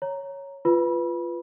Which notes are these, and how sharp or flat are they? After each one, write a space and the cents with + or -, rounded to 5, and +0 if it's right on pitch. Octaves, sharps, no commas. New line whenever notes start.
C#5 +0 A#5 +0
F4 -10 B4 +0 B5 -25